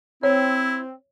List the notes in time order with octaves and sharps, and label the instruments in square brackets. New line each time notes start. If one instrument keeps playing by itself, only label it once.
[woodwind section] C4 [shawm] E4 [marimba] C#5